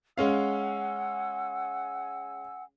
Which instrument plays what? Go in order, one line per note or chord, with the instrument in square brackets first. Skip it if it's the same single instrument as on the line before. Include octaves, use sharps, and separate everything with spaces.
[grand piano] G#3 C#4 F5 [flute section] F#5 G#5 E6